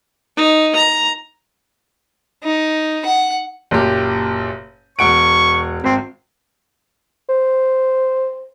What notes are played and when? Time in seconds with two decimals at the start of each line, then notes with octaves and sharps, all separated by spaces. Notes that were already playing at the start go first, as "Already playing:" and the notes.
0.36 D#4
0.75 A#5
2.43 D#4
3.06 F#5
3.71 F#1 A#2 G4
4.99 E1 F#5 C#6 D7
5.84 G#1 C4
7.29 C5